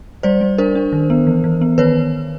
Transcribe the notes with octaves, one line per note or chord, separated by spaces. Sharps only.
G3 C5 D5
G3
D4 A#4 C5
D4
D#3
B3
E3
E3
B3
D#3 B4 C#5